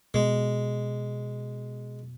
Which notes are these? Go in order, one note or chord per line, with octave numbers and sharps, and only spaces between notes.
B2 G#3